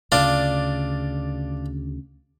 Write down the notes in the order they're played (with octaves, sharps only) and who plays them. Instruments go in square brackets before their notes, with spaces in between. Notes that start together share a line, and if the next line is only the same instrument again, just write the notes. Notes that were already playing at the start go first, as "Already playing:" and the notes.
[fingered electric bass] D2 C#3 [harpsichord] D4 F4 [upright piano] D5